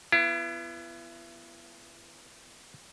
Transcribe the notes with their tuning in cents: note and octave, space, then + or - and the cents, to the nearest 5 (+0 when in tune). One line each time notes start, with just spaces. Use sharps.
B3 +0 E4 +40